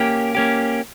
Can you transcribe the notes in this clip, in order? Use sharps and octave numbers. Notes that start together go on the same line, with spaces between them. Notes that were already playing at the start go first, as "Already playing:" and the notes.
Already playing: A#3 C#4 G4
A#3 C#4 G4